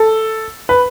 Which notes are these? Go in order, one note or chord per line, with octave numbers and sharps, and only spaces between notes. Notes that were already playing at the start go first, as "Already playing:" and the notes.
Already playing: A4
B4